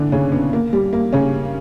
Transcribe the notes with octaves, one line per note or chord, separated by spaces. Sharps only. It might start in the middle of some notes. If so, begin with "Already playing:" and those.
Already playing: D3 E3 D4
C#3 C#4
B2 B3
A#3
G3
A#3
C#3 C#4